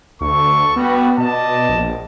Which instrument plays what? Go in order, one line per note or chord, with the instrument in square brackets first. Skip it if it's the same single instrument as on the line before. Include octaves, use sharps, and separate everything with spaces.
[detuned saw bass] D2 [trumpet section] A4 C#6
[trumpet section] G3 F#4 [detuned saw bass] B3
[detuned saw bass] B2 [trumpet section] D5 D#5 A5
[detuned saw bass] A#1